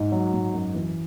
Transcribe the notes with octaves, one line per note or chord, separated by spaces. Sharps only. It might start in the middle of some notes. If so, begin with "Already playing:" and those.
Already playing: G#2
F#3
G#2
F#2
E3